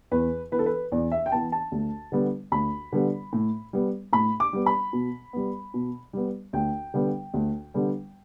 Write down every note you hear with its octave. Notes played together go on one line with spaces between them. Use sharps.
E2 B4
E3 B3 B4
A4
B4
E2 D5
E5
G5
E3 B3 A5
A5
D2
D3 G3 B3
D2 B5
D3 G3 B3
A2
G3 B3
A2 B5
D6
G3 B3
B5
B2
G3 B3
B2
G3 B3
D2 G5
D3 G3 B3
D2
D3 G3 B3